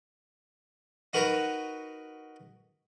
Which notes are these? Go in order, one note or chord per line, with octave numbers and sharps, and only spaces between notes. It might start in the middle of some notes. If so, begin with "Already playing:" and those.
D#4 F#4 A#4 B4 A#5 C#6